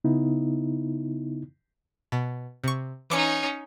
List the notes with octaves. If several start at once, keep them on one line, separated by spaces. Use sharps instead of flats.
C#3 B3 D#4 E4
B2
C3 C#6
E3 C#4 D#4 D6 C#7